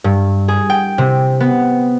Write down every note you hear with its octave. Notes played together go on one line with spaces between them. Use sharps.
G2
G#4
G5
C3
B3